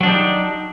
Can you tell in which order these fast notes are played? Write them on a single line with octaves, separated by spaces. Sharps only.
F#3 D4 D#4 G4